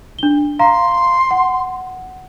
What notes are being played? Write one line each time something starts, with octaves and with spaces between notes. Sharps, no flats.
D4 G7
F5 A#5 C6
F#5